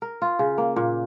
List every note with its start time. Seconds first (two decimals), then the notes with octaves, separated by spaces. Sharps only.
0.02 A#4
0.22 F4
0.39 C#3
0.58 A#3
0.76 A#2